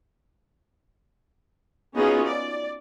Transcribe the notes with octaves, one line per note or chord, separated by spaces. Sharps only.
B3 C#4 D#4 F4 F#4 G#4
D5